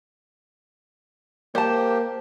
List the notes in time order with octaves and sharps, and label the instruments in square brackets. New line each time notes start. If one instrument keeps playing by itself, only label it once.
[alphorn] A#3 [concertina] G4 [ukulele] C5 A5